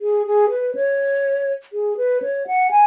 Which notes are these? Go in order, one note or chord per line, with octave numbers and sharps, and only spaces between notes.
G#4
G#4
B4
C#5
G#4
B4
C#5
F#5
G#5